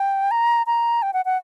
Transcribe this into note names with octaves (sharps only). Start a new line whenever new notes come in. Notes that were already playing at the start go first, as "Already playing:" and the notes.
Already playing: G5
A#5
A#5
G5
F#5
F#5